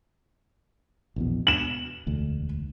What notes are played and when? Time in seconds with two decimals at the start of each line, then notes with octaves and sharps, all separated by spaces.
1.16 A#1 E2 B2
1.47 B2 E7 F#7
2.06 E1 D2